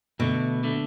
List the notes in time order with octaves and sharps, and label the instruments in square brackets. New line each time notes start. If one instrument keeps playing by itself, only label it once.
[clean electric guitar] D2 D3 A3 [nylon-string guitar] B2
[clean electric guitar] D3 A3